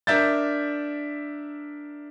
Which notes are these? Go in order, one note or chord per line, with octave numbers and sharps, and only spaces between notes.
D4 A#4 E5 G6 A6